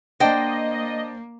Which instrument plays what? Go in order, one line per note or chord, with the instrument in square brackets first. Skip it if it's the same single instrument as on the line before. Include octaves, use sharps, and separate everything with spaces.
[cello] A#3 [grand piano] D4 D5 [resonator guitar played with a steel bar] C5 G5 [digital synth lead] D#5